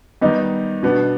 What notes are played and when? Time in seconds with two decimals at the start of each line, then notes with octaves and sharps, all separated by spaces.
0.21 D#3 G3 B3 D#4
0.83 B2 B3 D4